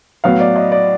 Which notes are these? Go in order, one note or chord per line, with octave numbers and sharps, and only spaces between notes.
A2 F#3 B3 F5
D5
D#5
D5